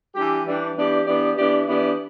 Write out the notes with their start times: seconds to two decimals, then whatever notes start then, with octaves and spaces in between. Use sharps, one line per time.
0.15 E3 G3 D4 G4
0.46 E3 G3 D4 G4
0.77 E3 B3 D4 G4 D5
1.07 E3 B3 D4 G4 D5
1.38 E3 B3 D4 G4 D5
1.68 E3 B3 D4 G4 D5